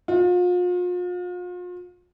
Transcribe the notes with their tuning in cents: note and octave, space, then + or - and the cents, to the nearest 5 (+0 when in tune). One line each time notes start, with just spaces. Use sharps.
F4 +40